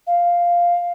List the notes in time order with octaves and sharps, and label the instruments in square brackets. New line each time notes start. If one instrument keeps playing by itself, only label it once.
[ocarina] F5